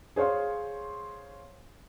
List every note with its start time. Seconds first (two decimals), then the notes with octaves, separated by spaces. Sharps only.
0.16 G#4 C5 C#5 F5 C6